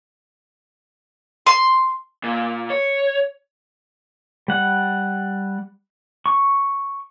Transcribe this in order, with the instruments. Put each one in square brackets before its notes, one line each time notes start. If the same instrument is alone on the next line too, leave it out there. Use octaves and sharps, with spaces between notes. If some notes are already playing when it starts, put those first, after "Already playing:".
[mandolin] C6
[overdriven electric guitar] A#2
C#5
[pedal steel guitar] G3 F#5
C#6